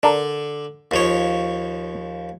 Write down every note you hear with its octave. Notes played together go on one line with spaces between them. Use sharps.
D3 D4 A#4
D#2 F3 C#5